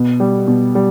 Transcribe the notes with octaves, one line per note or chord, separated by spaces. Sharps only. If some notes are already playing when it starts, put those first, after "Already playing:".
Already playing: B2
G3
B2
G3